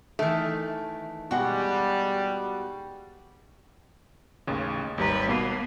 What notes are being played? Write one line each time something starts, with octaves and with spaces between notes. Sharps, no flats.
D#3 E3 A3
B2 G3 G#3 F#4 F#5
A1 D#2 C#3
G#1 D#2 G3 B4 A#5
B2 A#3 B3 C7